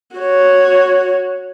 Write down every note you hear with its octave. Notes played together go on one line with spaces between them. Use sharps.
F#4 C#5